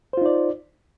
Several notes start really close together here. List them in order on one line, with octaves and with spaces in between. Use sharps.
C5 F4 D#4 D5